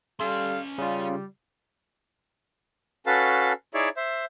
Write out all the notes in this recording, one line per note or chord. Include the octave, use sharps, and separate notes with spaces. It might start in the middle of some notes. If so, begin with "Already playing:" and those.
G3 C#4 A4 F5 C6
C#3 G3 F4
C#4 F#4 A4 B4 F5 A5
D#4 E4 G#4 C#5 D5 E5
C5 E5